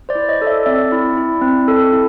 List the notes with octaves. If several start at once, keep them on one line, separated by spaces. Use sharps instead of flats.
C5 D5
E4
C#5 D#5
A4
D5 E5
C4 D5 E5
E4
E4
C4
A4
E4